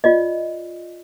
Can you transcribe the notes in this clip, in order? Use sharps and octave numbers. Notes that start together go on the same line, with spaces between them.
F4 D5 D#5